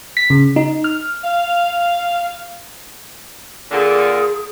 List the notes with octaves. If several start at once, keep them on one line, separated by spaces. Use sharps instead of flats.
B6
C#3
D#4
F6
F5
A#2 D3 G#4